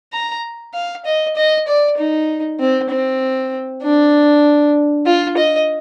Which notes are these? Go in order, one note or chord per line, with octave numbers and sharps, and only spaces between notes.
A#5
F5
D#5
D#5
D5
D#4
C4
C4
D4
F4
D#5